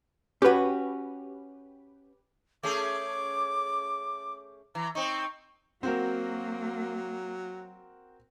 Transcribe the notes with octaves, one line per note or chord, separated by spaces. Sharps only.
C#4 F#4 G4 B4
A3 C#4 G#4 D6
E3 A#5
C4 D#4 C#6
F#3 A#3 C4 F#4 A#4